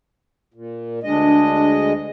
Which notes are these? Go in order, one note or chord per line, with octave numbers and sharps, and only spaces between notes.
A#2
D2 G#3 D4 D#5